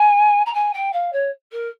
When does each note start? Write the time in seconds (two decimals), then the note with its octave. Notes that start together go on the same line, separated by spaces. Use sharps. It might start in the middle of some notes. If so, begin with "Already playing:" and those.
Already playing: G#5
0.46 A#5
0.53 G#5
0.73 G5
0.92 F5
1.12 C#5
1.51 A#4